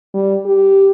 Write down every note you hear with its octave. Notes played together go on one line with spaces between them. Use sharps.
G3
G4